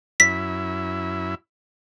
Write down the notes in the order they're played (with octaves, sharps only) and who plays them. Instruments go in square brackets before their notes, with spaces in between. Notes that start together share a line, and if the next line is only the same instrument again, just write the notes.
[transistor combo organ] F#2 E4 [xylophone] B6